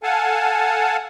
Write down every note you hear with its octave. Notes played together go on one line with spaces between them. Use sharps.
A4 F5 F#5 G#5 A5